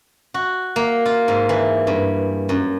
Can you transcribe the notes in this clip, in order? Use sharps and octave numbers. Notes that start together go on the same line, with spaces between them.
F#4
A#3
F4
G#2
E3
G2
F#2